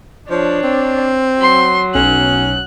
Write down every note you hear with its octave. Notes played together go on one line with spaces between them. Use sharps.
F3 D4 C#5
C4
F#3 C6
B1 C#4 F#6